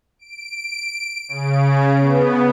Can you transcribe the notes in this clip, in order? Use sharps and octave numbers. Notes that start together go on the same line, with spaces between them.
D7
C#3
B3